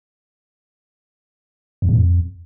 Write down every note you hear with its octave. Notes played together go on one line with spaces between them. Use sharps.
F2
A2
F2